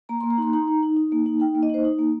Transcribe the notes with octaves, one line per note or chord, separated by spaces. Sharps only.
A#3 A#5
C6
A#3
A#5
D#4 C6
D#4 A#5
D#4
D#4
D#4
A#3
D#4
D#4 G5
A#3
D#5
D#4 C5
D#4
A#3